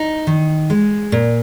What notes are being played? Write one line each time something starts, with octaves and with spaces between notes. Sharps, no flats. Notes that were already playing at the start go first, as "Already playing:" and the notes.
Already playing: D#4
D#3
G#3
A#2